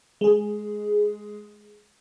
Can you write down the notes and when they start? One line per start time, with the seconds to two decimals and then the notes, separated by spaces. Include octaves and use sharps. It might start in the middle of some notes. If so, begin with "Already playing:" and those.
0.21 G#3 G#4